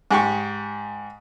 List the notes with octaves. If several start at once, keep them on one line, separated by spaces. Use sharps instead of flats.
G#2 G4 C#6